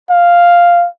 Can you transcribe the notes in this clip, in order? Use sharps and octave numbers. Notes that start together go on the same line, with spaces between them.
F5